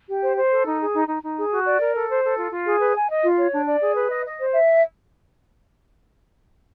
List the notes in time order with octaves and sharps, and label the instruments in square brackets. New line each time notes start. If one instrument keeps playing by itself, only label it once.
[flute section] G4
C5
C5
A4
D#4
G#4
D#4
D#4
D#4
G#4
F#4
D5
A#4
A4
C5
A4
F4
F4
G#4
B4
G#5
D#5
F4
C#5
D4
D5
G#4
B4
D#5
D#5
C5
E5